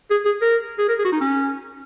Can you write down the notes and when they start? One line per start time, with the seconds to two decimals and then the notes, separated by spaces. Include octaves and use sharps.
0.11 G#4
0.25 G#4
0.42 A#4
0.78 G#4
0.89 A#4
0.99 G#4
1.05 F#4
1.12 D#4
1.21 C#4